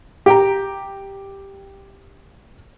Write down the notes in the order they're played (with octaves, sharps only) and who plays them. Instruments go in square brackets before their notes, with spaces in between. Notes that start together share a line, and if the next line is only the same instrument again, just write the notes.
[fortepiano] G4 G5 A#5